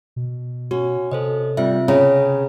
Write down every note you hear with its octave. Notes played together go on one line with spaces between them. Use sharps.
B2
C#4 F#4
C3 A4 C5 D#5
G3 C4 F4 E5
C#3 C#4 A#5 B5